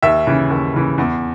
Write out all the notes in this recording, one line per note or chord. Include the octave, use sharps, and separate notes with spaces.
D#2 E5
C#3 E3
D#2
C#3 E3
E2